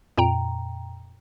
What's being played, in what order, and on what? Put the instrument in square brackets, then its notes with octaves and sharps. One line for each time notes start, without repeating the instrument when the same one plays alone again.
[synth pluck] F2 A#2 G5 A#5